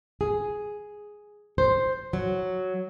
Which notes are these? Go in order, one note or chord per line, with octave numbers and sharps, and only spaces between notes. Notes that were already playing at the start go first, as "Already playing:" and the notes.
G#4
C5
F#3